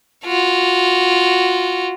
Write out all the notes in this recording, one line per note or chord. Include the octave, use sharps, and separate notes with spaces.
F4 F#4